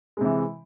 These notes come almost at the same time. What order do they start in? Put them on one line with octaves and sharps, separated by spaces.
G#3 C3 E3